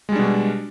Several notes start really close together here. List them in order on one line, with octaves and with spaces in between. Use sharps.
G#3 G3 D4 B2